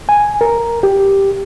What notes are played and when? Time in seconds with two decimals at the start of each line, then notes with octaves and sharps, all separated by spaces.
0.09 G#5
0.41 A#4
0.83 G4